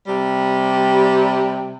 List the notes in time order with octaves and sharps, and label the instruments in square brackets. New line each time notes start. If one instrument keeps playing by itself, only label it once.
[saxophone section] C3 G3